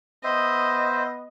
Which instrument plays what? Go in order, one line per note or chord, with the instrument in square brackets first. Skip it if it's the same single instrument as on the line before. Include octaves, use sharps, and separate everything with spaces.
[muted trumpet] B3 [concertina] C5 E5 [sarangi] D#5